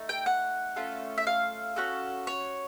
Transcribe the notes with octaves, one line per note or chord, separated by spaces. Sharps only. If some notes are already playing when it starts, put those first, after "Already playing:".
Already playing: A3 D#4
G5
F#5
A3 C#4 F4 A4
E5
F5
C#4 F#4 A4
C#5